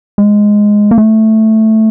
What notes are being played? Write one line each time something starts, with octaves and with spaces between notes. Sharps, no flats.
G#3
A#3
A3